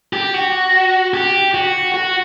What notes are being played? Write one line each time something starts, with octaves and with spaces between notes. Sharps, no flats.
G4
F#4
G4
F#4
F#4